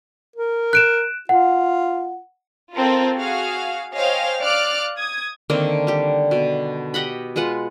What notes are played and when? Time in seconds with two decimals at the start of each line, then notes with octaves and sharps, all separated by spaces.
0.36 A#4
0.73 F#6 D7 E7
1.29 F4 F#5
2.75 C4 F4 A4 A#4
3.17 F#4 G#4 F5
3.95 C5 C#5 D#5 F5 G5 G#5
4.41 D5 F5 D6 F6 F#6 D7
4.97 D#6 G#6
5.50 D3 D#3 A#3 C4
5.87 G3 G4
6.31 B2
6.94 G4 D#5 F#5 B5
7.36 G#3 F4 B4 F#5